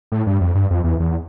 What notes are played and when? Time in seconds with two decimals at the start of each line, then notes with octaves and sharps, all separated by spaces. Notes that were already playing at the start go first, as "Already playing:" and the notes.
0.12 A2
0.27 G2
0.41 F2
0.55 G2
0.71 F2
0.84 E2
1.00 E2